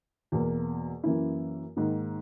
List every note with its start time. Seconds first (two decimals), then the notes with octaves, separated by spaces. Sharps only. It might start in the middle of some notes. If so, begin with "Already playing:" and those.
0.32 E2 B2 A#3
1.04 F#2 E3 A#3 E4
1.76 G#2 D#3 A#3